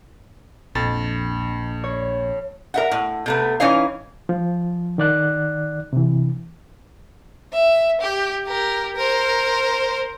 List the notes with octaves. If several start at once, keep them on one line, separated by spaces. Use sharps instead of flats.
A#1 F2 A6
C#5
A#4 E5 F#5
A2
C3 A3 B3
E3 C#4 D#4 C#5 F5
F3
D#3 D5 F#6
C3 E3
E5
G4
G4 A#4
A#4 C5